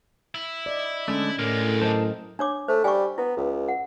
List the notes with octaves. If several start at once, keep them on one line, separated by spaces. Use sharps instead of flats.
E4
D5 D#5
D3 G#3 A3 C#4
A2 D3 G#3 A#4
F#3 A#4 C5 D#5 A5
D4 C#5 D6
A3 C5
G3 G#5 C#6
B3 E4
C#2
F#5